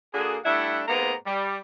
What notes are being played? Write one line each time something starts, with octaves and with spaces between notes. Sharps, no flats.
D3 A#3 F#4 G#4
G3 A3 D4 E4 E5 F#5
G#2 C3 A#3 B3 A#5
G3